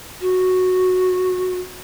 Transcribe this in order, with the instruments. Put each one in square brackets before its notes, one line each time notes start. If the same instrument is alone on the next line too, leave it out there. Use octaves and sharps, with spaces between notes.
[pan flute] F#4